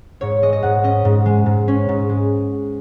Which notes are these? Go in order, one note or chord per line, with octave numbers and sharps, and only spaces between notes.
G#2 C#5
G#3 D#5
D#5
G#2 F#5
C#4 D#5
G#2
G#3
G#2
C#4
G#2
G#3